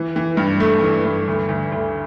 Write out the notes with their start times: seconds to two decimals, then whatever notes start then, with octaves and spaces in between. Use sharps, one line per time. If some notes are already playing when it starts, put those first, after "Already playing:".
Already playing: E3
0.16 E3
0.37 G2
0.60 A3
0.82 E3
1.05 G2
1.28 D2
1.49 D2
1.72 D2